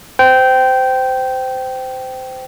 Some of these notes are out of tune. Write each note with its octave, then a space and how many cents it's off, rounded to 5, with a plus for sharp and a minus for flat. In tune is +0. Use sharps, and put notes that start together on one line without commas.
C5 -20 G5 -15